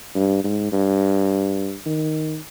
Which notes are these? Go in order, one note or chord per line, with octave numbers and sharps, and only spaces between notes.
G2
G#2
G2
D#3